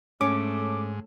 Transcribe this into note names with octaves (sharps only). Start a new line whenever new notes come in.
G#2 A3 C#4 D6